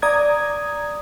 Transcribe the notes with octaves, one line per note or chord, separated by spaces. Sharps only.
D5 A#5 D#6 G#6